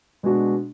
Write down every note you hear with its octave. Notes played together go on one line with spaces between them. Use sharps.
B2 G#3 D4 F#4